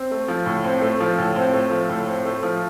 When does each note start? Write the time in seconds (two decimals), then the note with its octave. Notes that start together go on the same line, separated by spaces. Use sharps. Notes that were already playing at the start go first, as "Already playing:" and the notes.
Already playing: C4
0.11 A3
0.28 F3
0.46 A2
0.64 C4
0.82 A3
1.00 F3
1.19 A2
1.36 C4
1.54 A3
1.71 F3
1.89 A2
2.07 C4
2.25 A3
2.43 F3